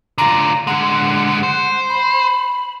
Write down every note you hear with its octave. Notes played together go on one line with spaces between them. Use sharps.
D3 F4 A#5
D3 G#3 F#5
C5
B5